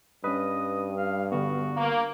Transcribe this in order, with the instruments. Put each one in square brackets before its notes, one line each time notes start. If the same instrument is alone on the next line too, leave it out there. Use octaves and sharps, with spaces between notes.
[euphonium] G2 [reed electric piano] C#4 B4 [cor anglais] D#5
[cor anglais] F5
[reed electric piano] D3 B3 [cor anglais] F#4
[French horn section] A#3